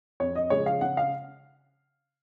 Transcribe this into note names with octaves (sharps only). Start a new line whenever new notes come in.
F2 C#5
D#5
C#3 F3 G#3 C#5
F5
C#3 F#5
F5